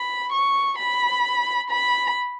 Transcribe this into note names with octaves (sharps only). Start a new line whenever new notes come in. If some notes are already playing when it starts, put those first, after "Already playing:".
Already playing: B5
C#6
B5
B5